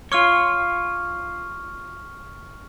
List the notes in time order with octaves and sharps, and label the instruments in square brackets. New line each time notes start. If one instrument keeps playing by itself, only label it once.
[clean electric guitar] F4 C#5 [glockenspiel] C#6 D6 F6